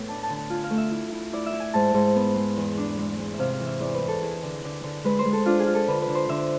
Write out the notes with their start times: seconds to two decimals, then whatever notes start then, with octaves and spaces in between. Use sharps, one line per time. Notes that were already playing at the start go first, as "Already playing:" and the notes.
Already playing: A2 B3
0.08 D4 A5
0.23 A5
0.30 D3
0.37 A5
0.50 F4 G#5
0.64 F5
0.70 A3
0.78 E5
0.91 E4
1.12 E4
1.33 E4 D5
1.46 E5
1.53 E4
1.60 G#5
1.74 G#2 A5
1.94 G#2
2.16 B3
2.36 G#3
2.57 E2
2.77 D4
2.98 G#3
3.19 G#3
3.34 E5
3.39 C3 F5
3.53 F5
3.60 E3
3.66 E5
3.80 E2 D5
3.94 B4
4.01 E2
4.08 A4
4.22 E4 G#4
4.43 D3
4.64 D3
4.84 D3
5.04 G#3 B4
5.19 C5
5.25 G#3
5.33 A4
5.46 D4 F4
5.60 G#4
5.67 F4
5.74 A4
5.88 D3 B4
6.02 B4
6.08 D3
6.15 C5
6.29 D3 E5